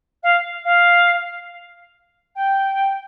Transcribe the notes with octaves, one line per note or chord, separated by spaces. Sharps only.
F5
F5
G5